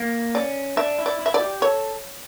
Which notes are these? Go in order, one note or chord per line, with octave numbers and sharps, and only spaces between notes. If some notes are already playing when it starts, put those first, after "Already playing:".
Already playing: A#3
C#4 D5
D4 E5
E4
D5
E4
E5
D5
G4
A4 C#5